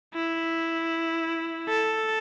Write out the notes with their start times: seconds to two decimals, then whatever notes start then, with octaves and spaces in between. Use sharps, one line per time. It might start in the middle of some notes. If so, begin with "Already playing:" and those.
0.14 E4
1.68 A4